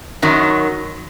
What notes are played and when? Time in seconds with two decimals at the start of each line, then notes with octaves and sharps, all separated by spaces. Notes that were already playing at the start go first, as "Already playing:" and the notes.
0.22 F#2 D#3 F#3